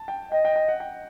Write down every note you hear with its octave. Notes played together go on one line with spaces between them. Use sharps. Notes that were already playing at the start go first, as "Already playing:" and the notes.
Already playing: A5
G5
D#5 G5
G5
G5
F#5
G5